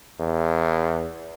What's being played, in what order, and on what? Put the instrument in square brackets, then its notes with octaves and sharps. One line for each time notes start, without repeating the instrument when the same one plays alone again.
[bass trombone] E2